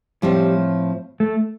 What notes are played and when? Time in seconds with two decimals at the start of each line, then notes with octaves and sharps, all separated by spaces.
0.22 A2 F3 G3 C4
1.20 A3